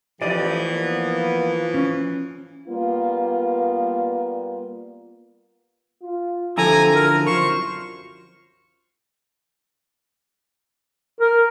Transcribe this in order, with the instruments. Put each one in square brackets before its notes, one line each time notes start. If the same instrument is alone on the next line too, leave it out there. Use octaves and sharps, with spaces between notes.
[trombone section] A1 E2 G4 [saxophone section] E3 F3 [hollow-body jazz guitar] D5 D#5
[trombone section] A#3 B3
[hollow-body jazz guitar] C#4
[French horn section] G3 A#3 B3 F4
[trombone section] F4
[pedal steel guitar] D3 F3 E4 [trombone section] C4 G4 A4 [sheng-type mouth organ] G#5 A#5
[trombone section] C2 F#2 [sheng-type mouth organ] A#4
[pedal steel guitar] F4 C5 [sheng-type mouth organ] C#6
[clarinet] A#4